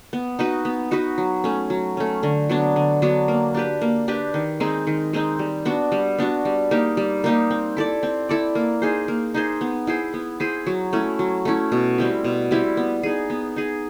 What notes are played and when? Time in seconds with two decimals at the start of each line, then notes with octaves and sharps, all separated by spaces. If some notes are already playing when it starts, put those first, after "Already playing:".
0.13 B3
0.39 D#4 F#4 B4
0.65 B3
0.91 D#4 F#4 B4
1.18 F#3
1.44 A3 C#4
1.70 F#3
1.97 A3 C#4
2.23 D3
2.49 F#3 B3 D4
2.76 D3
3.02 F#3 B3 D4
3.28 A#3
3.54 D4 G4 B4
3.81 A#3
4.08 D4 G4 B4
4.34 D#3
4.60 G#3 C4 D#4
4.87 D#3
5.13 G#3 C4 D#4
5.39 G3
5.65 B3 D4 F#4
5.92 G3
6.18 B3 D4 F#4
6.45 G3
6.71 A#3 D#4 G4
6.97 G3
7.24 A#3 D#4 G4
7.51 C4
7.77 E4 A4 D5
8.03 C4
8.29 E4 A4 D5
8.55 A#3
8.82 D#4 G#4 C5
9.08 A#3
9.34 D#4 G#4 C5
9.61 B3
9.87 E4 G#4 C5
10.14 B3
10.40 E4 G#4 C5
10.67 F#3
10.93 A3 C#4 E4
11.19 F#3
11.45 A3 C#4 E4
11.72 B2
11.98 G3 C4 E4
12.24 B2
12.51 G3 C4 E4
12.77 B3
13.03 D#4 G#4
13.30 B3
13.56 D#4 G#4